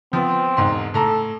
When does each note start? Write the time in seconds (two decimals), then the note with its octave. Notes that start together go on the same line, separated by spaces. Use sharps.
0.13 F3 B3 C4
0.57 E1 G#2 C6
0.94 A2 A4 A#5